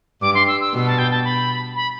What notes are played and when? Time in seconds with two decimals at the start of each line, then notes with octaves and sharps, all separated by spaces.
0.22 G2 D6
0.35 C6
0.48 E6
0.61 E6
0.74 B2
0.86 A5
0.98 G5
1.11 A5
1.24 B5
1.76 B5